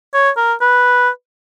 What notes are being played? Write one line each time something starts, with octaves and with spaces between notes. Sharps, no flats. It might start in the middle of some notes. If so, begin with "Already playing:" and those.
C#5
A#4
B4